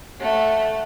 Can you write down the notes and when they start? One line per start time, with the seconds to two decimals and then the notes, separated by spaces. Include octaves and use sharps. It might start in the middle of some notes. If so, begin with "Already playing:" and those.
0.21 A3 F#5